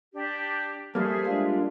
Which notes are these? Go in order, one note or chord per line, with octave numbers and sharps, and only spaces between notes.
D4 G4
G3 A#3 G#4 A4 C5 E5
G#3 D4 F4